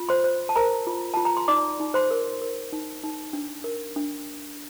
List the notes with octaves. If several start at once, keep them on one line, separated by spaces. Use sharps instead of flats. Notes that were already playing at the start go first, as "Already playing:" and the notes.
Already playing: F4
C5 C6
C5
A5
A#4 C5 A#5
F4
F4 A5
A#5
C6
D#4 D5 D6
D#4
C5 C6
A#4
A#4
D#4
D#4
D4
A#4
D4